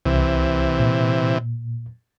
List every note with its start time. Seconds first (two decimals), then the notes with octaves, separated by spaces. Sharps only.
0.06 C2 C3 E3
0.79 A#2